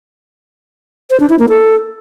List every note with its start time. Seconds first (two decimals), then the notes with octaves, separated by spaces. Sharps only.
1.10 C5
1.20 D4
1.30 E4
1.39 A#3
1.49 A4